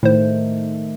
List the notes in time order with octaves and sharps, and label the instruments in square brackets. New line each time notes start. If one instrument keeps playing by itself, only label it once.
[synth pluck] A2 C5 [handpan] D#3 A3